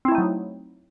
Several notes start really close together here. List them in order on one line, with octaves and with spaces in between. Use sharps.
C4 E4 A3 D#4 F#3